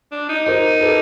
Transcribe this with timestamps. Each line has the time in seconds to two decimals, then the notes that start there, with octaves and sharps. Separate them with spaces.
0.12 D4
0.29 D#4
0.46 D#4 A#4 C5
0.81 A4 B4